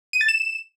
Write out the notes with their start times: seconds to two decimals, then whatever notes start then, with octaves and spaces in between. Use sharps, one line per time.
0.13 D#7
0.21 A6
0.28 E7